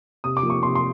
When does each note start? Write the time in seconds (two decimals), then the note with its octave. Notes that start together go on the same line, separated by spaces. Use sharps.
0.24 C3 D#6
0.37 D6
0.43 F3 A#3
0.50 C#6
0.63 C3 C6
0.75 C6